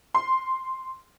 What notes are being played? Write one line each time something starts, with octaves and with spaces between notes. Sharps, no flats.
C6